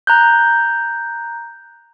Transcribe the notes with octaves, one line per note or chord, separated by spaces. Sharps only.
A#5 F#6 G6